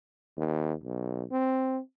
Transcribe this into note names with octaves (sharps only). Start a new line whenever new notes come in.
D#2
B1
C4